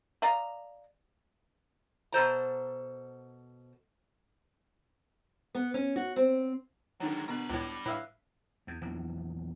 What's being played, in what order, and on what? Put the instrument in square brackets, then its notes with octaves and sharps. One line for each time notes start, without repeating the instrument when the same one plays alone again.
[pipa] D5 D#5 F5 A#5
[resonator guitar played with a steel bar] B2 A4 C5 A#5
[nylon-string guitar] B3
C#4
F#4
C4
[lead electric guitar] F#2 G#3 [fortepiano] D3 D#3 F#3
[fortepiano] B2 D3 [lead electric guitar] A#4 B4
[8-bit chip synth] C#2 A2 [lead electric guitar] G3 D4
[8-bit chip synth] A2 [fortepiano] B4 E5 F5
[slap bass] E2
A#1 E2 E3 F#3